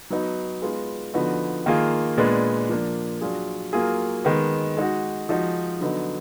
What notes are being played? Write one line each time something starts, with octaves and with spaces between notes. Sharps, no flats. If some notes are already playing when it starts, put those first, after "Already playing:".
F#3 B3 D#4
G#3 B3 F4 G#4
D3 F3 B3 D#4 F#4
D#3 A#3 F4 G#4
A#2 G#3 B3 D4
F3 A#3 D4
F#3 D4 F4 G#4
F#3 A#3 F4 G#4
D#3 G#3 B3
G#3 D#4 F#4
F3 G#3 D#4 F#4
D3 F#3 B3 D#4